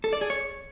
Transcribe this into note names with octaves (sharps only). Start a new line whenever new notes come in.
A4
D5
G#4
C#5